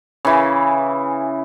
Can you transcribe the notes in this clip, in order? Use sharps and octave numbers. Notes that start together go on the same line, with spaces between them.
C#3 E3